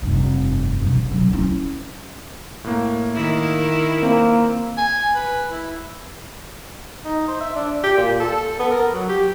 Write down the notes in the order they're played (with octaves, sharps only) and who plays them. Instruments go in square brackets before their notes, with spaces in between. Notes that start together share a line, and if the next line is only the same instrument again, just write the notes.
[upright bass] F1 G2
G2 B2
D3 F#3
C#4 E4
[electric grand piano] A2 A#3
[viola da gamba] D#3 E4
[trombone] A#3 [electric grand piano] C4
[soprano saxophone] G#5
B4
E4
[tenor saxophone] D#4
C5
E5
D4
G4
A#2
A4
B3
A#4
F#3
G4